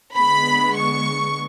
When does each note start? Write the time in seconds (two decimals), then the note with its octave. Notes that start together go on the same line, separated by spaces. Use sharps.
0.16 D3 G#3 B3 B5
0.78 C#6